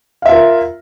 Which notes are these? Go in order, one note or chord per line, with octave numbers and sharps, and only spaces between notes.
F4 A#4 E5 F5